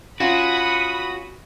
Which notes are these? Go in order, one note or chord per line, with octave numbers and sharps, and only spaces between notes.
C#4 F4 F#4 B5 D#6